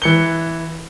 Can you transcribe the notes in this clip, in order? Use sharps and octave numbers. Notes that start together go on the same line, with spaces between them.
E3 C#7 G7